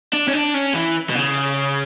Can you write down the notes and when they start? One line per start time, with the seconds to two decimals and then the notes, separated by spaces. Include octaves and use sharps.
0.13 D4
0.28 C#4
0.33 D4
0.54 C#4
0.74 E3
1.09 B2
1.15 C#3